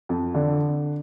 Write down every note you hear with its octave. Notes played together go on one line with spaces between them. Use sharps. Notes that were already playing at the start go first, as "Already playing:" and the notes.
F2
D3